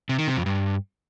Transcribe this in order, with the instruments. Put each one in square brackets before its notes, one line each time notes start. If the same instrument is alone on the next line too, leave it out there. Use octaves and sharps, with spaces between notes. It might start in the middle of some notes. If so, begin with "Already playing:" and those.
[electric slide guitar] C3
D#3
C3
F2
G2